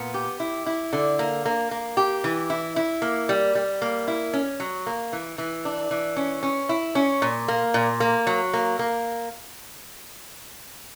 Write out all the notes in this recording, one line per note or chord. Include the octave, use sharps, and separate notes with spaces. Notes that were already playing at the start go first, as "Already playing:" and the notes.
Already playing: A#2 B3
G4
E4
E4
D3
A#3
A#3
A#3
G4
E3
E4
E4
A#3
G3
G3
A#3
E4
C#4
F#3
A#3
E3
E3
D4
E3
C#4
C#4
E4
C#4
A#2
A#3
A#2
A#3
F#3
A#3
A#3